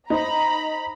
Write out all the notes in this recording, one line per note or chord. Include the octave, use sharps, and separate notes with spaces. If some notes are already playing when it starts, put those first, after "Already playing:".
D#4 C5 D#5 A#5 B5